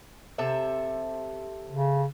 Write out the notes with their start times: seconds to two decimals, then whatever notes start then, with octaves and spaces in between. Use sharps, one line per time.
0.38 C3 A4 E5
1.70 C#3